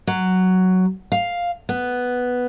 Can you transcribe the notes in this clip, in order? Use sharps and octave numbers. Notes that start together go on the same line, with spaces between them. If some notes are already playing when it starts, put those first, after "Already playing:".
F#3
F5
B3